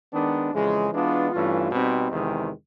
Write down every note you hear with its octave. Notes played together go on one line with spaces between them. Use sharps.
D#3 G#3 B3 D4
F2 C#3 E3 G#3
E3 G#3 B3 D4 F4
G2 E3 A3 C#4 F4
B2 G3 C4 D#4
E2 C3 D#3 G#3